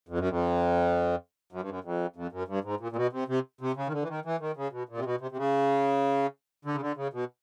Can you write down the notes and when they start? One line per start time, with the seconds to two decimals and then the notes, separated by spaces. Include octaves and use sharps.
0.09 F2
0.19 F#2
0.29 F2
1.52 F#2
1.61 G2
1.69 F#2
1.84 F2
2.16 F2
2.32 F#2
2.48 G2
2.64 G#2
2.80 A#2
2.92 A#2
2.96 B2
3.13 C3
3.28 C3
3.61 C3
3.76 C#3
3.87 D#3
3.92 D3
4.02 E3
4.09 D#3
4.25 E3
4.40 D#3
4.57 C#3
4.72 B2
4.89 A#2
4.97 C3
5.04 B2
5.21 C3
5.31 C3
5.37 C#3
6.65 D3
6.74 C#3
6.81 D3
6.96 C#3
7.13 B2